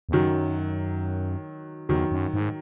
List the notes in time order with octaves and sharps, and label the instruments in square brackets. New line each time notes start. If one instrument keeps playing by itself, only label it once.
[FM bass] E2
[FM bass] F#2 [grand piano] D#3 F#3
[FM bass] E2 [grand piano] D#3 F#3
[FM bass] F#2
G#2